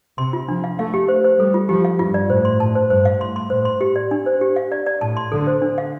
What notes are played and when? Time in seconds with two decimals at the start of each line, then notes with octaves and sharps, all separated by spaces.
0.18 C3 C6
0.33 F4
0.48 F3 D4
0.64 F5
0.78 A3 F5
0.94 G4
1.08 C5
1.24 C5
1.40 G3 A4
1.54 F4
1.69 F3 G4
1.84 F5
1.99 G2 F4
2.14 D5
2.30 A2 C5
2.45 C6
2.60 A2 A5
2.75 C5
2.90 G2 C5
3.05 F5
3.20 A2 C6
3.36 C6
3.50 A2 C5
3.65 C6
3.81 G4
3.96 D5
4.11 D4
4.26 C5
4.41 G4
4.56 F5
4.72 D5
4.86 D5
5.01 A2 A5
5.17 C6
5.32 D3 A4
5.47 C5
5.62 D4
5.78 F5